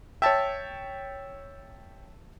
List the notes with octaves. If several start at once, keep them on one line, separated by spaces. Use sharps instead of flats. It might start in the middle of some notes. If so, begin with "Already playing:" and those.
C#5 E5 G5 A5